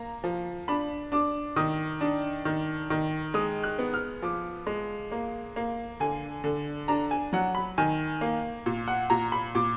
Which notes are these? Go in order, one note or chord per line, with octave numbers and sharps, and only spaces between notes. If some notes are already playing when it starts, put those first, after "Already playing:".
Already playing: A#3 A#5
F3
D4 B5
D4 D6
D#3 D#6
D4
D#3
D#3
G#3 D#6
F#6
B3
F6
F3 D6
G#3
A#3
A#3
D3 G#5
D3
D4 A#5
G#5
F#3 F#5
B5
D#3 G#5
A#3
A#2
F#5
A#2 A#5
B5
A#2 D6